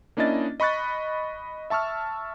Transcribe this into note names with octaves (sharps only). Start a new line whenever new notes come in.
A#3 C#4 D4 E4 D#5 A6
D#5 B5 C#6 F#6 A6
E5 A5 C#6 E6 F6